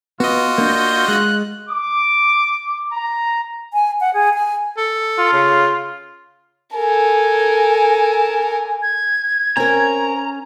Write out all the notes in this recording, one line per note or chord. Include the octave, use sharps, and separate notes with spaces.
B3 F4 F#4 D#5
A#3 D4 G6
G#3 F#6
D6
A#5
G#5
F#5
G#4
G#5
A4
F4
C#3
A4 A#4 G#5
G#6
C4 C#4 A#4 G#5 A#5